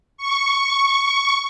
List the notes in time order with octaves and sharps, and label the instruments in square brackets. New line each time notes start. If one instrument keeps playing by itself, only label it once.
[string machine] C#6